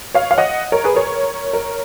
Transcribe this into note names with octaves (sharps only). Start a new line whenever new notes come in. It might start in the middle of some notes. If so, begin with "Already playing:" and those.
C#5 F5
F5
D#5 F#5
A#4 C#5
G#4 B4
A#4 C#5
A#4 C#5